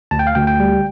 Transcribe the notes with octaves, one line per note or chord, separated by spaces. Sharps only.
D2 A5
G5
F5
D2 G5
G5
G3